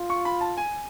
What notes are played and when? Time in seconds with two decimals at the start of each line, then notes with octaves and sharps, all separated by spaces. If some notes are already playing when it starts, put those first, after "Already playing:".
Already playing: F4
0.10 C#6
0.25 B5
0.41 A5
0.57 G#5